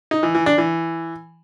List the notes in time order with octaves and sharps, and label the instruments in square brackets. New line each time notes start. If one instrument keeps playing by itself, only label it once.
[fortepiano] D#4
E3
E3
D4
E3